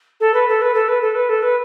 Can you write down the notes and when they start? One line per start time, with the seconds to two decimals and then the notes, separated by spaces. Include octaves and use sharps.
0.20 A4
0.34 B4
0.48 A4
0.61 B4
0.74 A4
0.88 B4
1.01 A4
1.14 B4
1.29 A4
1.42 B4